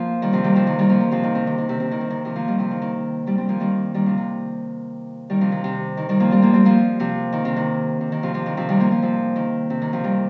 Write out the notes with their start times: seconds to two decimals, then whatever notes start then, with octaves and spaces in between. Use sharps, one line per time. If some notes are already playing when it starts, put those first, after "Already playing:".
Already playing: F3 A#3
0.22 D#3 G3
0.33 C3 F3
0.44 D#3 G3
0.55 C3 F3
0.67 D#3
0.79 D#3 G3
0.89 F3 A#3
1.00 D#3
1.11 C3 F3
1.23 D#3
1.35 C3
1.47 D#3
1.58 D#3
1.69 C3
1.80 C3
1.91 D#3
2.01 C3
2.10 D#3
2.25 C3 F3
2.36 F3 A#3
2.47 D#3 G3
2.58 C3 F3
2.71 D#3
2.82 D#3
3.26 D#3 G3
3.37 G3 C4
3.49 F3 A#3
3.60 D#3 G3
3.94 D#3 G3
4.06 C3 F3
4.17 D#3
5.30 D#3 G3
5.41 C3 F3
5.52 D#3
5.64 C3
5.97 D#3
6.09 D#3 G3
6.20 F3 A#3
6.31 G3 C4
6.42 F3 A#3
6.54 G3 C4
6.65 F3 A#3
7.00 C3 F3
7.33 D#3
7.45 C3
7.56 D#3
8.01 C3
8.12 D#3
8.23 C3 F3
8.34 C3 F3
8.46 D#3
8.57 C3 F3
8.69 D#3 G3
8.80 F3 A#3
8.91 F3 A#3
9.02 C3 F3
9.36 D#3
9.70 C3
9.82 D#3
9.93 C3 F3
10.04 D#3 G3